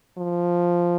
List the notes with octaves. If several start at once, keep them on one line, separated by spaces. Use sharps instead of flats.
F3